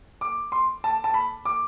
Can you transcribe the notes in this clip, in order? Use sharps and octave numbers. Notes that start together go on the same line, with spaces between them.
D6
C6
A5
A5
B5
D6